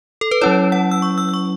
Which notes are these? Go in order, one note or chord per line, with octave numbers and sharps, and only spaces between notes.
A4
B4
F#3 C#4 E4 C#5
F#5
E6
C#6
E6
E6
C#6